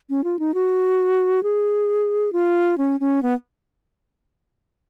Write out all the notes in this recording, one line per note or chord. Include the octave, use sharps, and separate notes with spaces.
C#4
F4
D#4
F#4
G#4
F4
C#4
C#4
B3